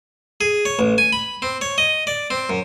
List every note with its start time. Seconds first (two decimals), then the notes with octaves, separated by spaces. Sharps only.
0.41 G#4
0.65 C#5
0.79 A1
0.98 G#5
1.13 B5
1.42 C4
1.61 C#5
1.78 D#5
2.07 D5
2.31 C4
2.49 F#2